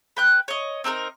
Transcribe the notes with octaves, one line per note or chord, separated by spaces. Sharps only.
B4 G5 F#6
C#5 D#5
C4 D#4 A4 A#4